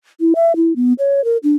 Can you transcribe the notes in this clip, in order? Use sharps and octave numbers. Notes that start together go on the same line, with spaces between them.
E4
E5
E4
B3
C#5
A#4
D4